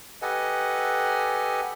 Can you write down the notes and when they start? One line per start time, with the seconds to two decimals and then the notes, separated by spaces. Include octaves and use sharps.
0.22 G4 A4 B4 D#5 F#5 G#5